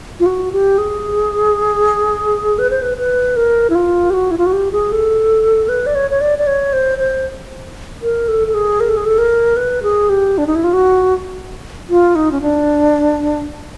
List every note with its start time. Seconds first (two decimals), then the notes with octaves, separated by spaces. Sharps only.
0.20 F4
0.26 F#4
0.52 G4
0.78 G#4
2.59 B4
2.70 C5
2.82 B4
2.98 B4
3.36 A#4
3.70 E4
3.75 F4
4.10 G4
4.14 F#4
4.31 E4
4.38 F4
4.46 F#4
4.53 G4
4.72 G#4
4.92 A4
5.69 B4
5.86 D5
5.95 C#5
6.11 C#5
6.21 D5
6.38 D5
6.47 C#5
6.73 C5
6.99 C5
8.02 A#4
8.28 A4
8.47 A4
8.54 G#4
8.80 A#4
8.89 A4
8.97 G#4
9.05 A4
9.18 A#4
9.57 B4
9.83 G#4
10.09 G4
10.38 D4
10.47 D#4
10.55 E4
10.64 F4
10.73 F#4
11.89 F4
12.15 D#4
12.32 C#4
12.41 D4